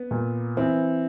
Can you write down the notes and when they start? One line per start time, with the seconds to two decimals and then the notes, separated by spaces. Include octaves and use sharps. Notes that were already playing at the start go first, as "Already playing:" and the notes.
Already playing: B3
0.11 A#2
0.57 E3 C4